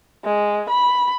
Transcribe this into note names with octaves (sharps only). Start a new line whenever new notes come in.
G#3
B5